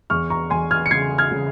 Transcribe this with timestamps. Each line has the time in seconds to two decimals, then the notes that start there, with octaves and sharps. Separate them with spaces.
0.10 E2 C#6 F6
0.30 A#5 C#6
0.50 E2 G#5 C6
0.71 F6 G#6
0.86 C#7
0.91 C#3 G#6 C7
1.18 F6 G#6
1.31 C#3